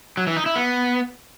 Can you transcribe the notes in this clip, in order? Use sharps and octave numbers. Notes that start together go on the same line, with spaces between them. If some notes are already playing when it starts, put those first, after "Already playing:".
F#3
E3
D#4
E4
B3